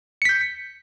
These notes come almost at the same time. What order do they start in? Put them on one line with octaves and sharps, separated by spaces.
C#7 B6 G6